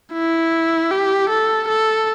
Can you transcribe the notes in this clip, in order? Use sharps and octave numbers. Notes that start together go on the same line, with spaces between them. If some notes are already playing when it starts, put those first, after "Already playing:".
E4
G4
A4
A4